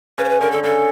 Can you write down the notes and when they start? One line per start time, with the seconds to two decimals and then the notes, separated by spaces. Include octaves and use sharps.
0.18 C#3 B4
0.24 C5
0.29 B4
0.41 D3 A#4
0.51 D3 A4
0.63 C#3 A4